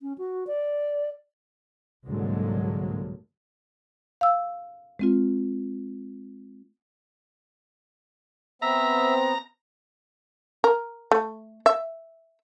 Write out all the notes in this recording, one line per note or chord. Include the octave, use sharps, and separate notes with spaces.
C#4
F#4
D5
C2 G#2 D3 F#3 G#3 A#3
F5 E6
G#3 C4 F4
B3 C4 E5 A#5
A#4
A3
E5